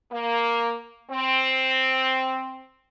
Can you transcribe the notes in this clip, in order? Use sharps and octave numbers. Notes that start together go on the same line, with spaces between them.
A#3
C4